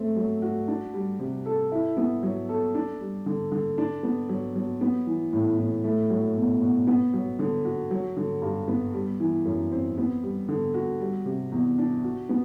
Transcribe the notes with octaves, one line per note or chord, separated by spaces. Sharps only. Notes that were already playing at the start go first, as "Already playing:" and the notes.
Already playing: A3 C4
F#3
F#4
D4
G3
C3
A4
E4
B3
F#3
A4
D4
G3
D3
D3
D4
B3
F#3
F#3
B3
E3
A2
A2
A3
F#3
B2
B2
B3
F#3
D3
F#4
F#3
D3
G2
B3
G3
E3
F#2
C4
B3
G3
D3
F#4
G3
C3
E2
D4
F#4
B3